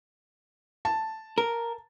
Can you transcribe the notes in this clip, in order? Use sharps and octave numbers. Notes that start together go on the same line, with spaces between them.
A5
A#4